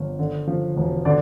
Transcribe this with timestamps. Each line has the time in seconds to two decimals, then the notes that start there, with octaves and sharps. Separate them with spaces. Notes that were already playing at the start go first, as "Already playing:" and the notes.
Already playing: G1 F3
0.19 D3
0.47 F3
0.77 E1
1.05 D3 D5